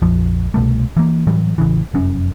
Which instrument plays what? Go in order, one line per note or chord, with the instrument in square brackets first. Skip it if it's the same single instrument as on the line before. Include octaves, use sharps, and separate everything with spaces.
[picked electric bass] A#1 F2 F3
C2 B2 G3 A3
E3 A#3
A2 E3 F#3 G3
A1 C#3 E3
F1 F#2 C#4